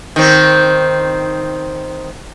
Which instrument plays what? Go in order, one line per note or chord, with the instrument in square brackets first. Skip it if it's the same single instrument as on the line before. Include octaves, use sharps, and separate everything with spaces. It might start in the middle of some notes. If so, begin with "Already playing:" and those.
[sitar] D#3 C4